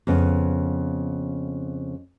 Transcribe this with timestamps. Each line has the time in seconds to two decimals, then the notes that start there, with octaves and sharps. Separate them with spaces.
0.07 F2 C#3 B3